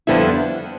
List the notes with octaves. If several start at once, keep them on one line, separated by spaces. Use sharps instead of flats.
F2 D3 G3 B3 E4